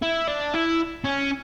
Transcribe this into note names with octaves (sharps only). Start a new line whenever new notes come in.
E4
D4
E4
C#4